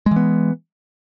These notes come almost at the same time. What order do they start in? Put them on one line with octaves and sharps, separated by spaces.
G#3 E3 B3